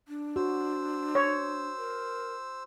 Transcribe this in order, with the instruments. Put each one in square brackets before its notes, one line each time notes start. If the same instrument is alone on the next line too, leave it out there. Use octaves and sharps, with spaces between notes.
[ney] D4
[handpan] F#4 [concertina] C5 E6
[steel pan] C#5
[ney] A#4